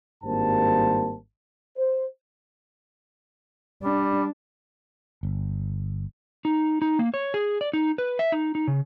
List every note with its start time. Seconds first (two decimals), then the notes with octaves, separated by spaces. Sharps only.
0.24 G#1 G2 G3 A#3 C5 A5
1.76 C5
3.82 G3 D4
5.23 G1
6.45 D#4
6.82 D#4
6.99 A#3
7.14 C#5
7.34 G#4
7.61 D5
7.73 D#4
7.98 B4
8.19 E5
8.32 D#4
8.55 D#4
8.68 C#3